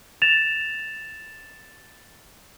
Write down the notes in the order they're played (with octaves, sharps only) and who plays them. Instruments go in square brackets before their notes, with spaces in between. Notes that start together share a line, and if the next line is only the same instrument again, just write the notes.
[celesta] A6 E7 F7